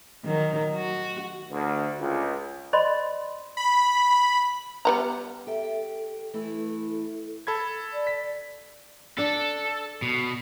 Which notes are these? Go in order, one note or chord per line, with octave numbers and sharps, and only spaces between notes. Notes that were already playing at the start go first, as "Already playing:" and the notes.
D#3 F#3
F#4
D2
C#2
C5 D5 D#5 B5 C6
B5
G3 B3 A#5
G4 A4 E5
A4
E3 A3 E4
A4 B5 G#6
D5
B6
D4 A4
B2